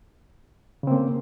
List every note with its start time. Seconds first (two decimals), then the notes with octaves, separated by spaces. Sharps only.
0.83 C#3
0.87 C4
0.91 A#3